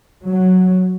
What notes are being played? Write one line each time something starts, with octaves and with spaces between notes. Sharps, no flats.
F#3